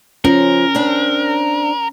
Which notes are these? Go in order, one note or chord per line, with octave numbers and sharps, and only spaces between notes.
F3 C#4 A#4
C4 D4